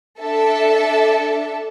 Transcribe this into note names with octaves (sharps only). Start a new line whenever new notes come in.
D4 A4 E5 A5